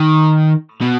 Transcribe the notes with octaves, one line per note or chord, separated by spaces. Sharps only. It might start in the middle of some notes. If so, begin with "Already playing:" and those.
Already playing: D#3
B2